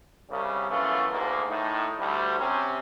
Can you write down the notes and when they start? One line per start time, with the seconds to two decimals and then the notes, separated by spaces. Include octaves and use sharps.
0.30 C2 C#3 G3
0.70 F#2 E3 A3 B3 C#4 F4
1.12 D2 G#2 A#3
1.50 A2 D#3 D#4
1.99 D2 G3
2.39 C3 C4 C#4